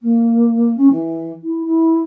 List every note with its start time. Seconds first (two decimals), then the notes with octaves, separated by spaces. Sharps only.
0.01 A#3
0.77 C#4
0.90 E3
1.43 E4
1.65 E4